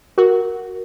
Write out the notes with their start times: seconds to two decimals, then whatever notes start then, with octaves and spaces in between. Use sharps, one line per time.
0.18 F#4 A#4